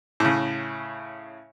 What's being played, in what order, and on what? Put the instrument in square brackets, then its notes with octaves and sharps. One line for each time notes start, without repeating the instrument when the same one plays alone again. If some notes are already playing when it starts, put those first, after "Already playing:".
[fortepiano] A2 C#3